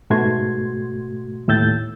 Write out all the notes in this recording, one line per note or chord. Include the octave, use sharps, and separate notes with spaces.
G#2 B2 A3 F#4 C6 G#6
D#2 A2 E6 G6 A6